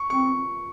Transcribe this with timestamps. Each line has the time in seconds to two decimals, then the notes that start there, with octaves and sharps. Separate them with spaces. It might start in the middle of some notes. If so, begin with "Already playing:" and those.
Already playing: C#6
0.10 C4 C#6